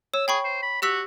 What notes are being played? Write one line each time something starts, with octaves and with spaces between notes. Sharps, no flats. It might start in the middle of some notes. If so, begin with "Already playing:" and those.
C#5 E6
G#4 G5 B5 C#6
C5
B5
F#4 G4 E6 B6